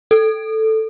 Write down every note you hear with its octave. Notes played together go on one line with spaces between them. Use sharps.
A4